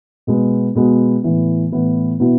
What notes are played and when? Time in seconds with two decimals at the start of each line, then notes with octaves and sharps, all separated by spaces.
0.27 B2 G#3 B3
0.75 B2 G#3 B3
1.23 A2 E3 B3
1.72 A2 E3 B3
2.20 B2 B3 E4